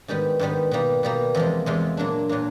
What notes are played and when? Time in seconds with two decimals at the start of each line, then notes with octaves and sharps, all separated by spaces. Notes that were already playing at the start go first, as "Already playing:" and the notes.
0.08 G#2 D#3 G3 B3
0.39 G#2 D#3 G3 B3
0.71 B2 G3 A#3
1.03 B2 G3 A#3
1.35 E2 C3 F3 G#3
1.66 E2 C3 F3 G#3
1.97 A#2 F#3 A#3 D4
2.29 A#2 F#3 A#3 D4